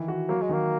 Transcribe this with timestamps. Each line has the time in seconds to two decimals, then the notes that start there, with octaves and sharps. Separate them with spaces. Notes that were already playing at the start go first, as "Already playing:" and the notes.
Already playing: D#3 E3
0.08 F#4
0.29 F#3 A#3
0.41 G#3
0.49 D#3 A#3